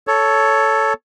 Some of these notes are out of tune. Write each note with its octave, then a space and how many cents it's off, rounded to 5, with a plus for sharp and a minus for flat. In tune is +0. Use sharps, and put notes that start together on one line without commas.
A4 +0 C#5 +10